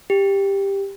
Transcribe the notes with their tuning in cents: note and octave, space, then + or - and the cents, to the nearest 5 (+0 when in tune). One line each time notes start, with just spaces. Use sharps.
G4 +10